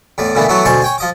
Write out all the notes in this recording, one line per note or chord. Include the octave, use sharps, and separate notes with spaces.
E2 A2 D5
A#2 D3 E3 A3 B3
E3 F#3 A3 B3 E4 F#4
D2 B2 C5 G#5 A5 C#6
C#5 G5 G#5
F3 D#5 D6